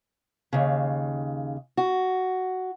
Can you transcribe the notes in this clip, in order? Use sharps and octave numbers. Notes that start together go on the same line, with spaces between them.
D#2 C#3
F#4